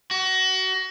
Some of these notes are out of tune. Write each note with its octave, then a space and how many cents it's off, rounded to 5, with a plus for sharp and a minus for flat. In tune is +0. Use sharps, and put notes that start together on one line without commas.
F#4 +25